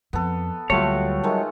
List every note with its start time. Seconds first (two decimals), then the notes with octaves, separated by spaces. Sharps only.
0.13 F2 B3 A4
0.70 D2 F#3 G3 A3 A#3 F4 C#5
1.23 D#3 G#3 A3